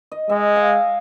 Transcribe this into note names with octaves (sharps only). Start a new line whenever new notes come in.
D#5
G#3 E5
F5